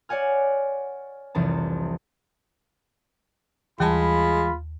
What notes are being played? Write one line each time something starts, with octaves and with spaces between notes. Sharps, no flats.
C#5 D5 F#5 G#5 F6
F1 C2 E3 A5
D#2 E3 G3 G#3 F4 A5 B5